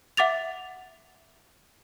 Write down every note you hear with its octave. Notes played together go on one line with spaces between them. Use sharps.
E5 F#5 D6 A6 F7